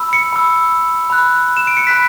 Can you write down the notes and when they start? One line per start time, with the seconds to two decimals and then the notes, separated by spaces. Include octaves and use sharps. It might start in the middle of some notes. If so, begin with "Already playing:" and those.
Already playing: B5 E6
0.13 C#7
0.33 B5 E6
1.10 B5 F#6
1.57 E7
1.67 D7
1.77 C#7
1.87 B5 F#6 B6